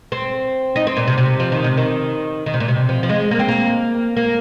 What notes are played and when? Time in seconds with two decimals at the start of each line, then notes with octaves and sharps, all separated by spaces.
0.12 C4
0.76 D#4
0.87 C4
0.97 A#2
1.08 C3
1.18 C3
1.40 F3
1.52 D#3
1.64 C3
1.77 D#3
2.46 D#3
2.54 C3
2.60 A#2
2.68 C3
2.89 F3
3.03 F3
3.09 G#3
3.31 A#3
3.39 C4
3.48 A#3
4.17 A#3